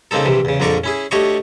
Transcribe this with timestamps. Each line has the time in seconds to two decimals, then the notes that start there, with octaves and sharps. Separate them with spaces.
0.11 C#3 A#3 C4 D#4 A4
0.25 A#1 C3 E3
0.45 E2 C#3
0.60 A#1 F2 D3 A#4 D5 C#6
0.84 C#4 E4 G#4
1.11 D2 A3 G4 C#5 D#5 C#6